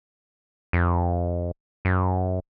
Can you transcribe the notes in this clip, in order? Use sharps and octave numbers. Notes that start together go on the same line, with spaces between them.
F2
F#2